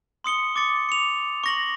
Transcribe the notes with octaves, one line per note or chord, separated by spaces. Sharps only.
C6 D#6 C#7 G7
D6 A6 C#7
C#7 F7
C#6 A#6 F#7